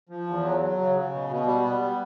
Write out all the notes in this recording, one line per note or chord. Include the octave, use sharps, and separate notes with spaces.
F3
E2
F#3
F#3
C#3
C#3
B2
B2
G3
B3
G3